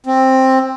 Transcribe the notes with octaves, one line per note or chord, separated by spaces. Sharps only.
C4